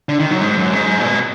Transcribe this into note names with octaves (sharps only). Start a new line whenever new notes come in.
D3
D#3
F#2
G#2
F#2
G#2
A#2
B2